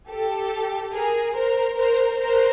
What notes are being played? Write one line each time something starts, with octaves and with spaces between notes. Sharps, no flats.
G4 A4
G#4 A#4
A#4 C5
A#4 C5
A#4 C5